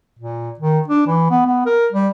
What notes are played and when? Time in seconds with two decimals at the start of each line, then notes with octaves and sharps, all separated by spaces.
0.19 A#2
0.59 D#3
0.88 D4
1.07 E3
1.30 B3
1.47 B3
1.66 A#4
1.92 G3